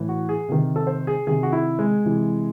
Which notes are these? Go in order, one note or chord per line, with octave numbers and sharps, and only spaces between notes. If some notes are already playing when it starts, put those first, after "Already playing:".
Already playing: A2 E3
F#4
G#4
C3 D#3
A4
C5
G#4
C3 D#3 G#4
F#4
E4
G#3
C3 E3